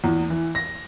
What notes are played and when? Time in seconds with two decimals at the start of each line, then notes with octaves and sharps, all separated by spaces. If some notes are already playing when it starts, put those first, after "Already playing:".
0.04 E2
0.30 E3
0.55 A#6